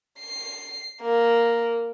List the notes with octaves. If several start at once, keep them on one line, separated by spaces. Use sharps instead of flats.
C7
A#3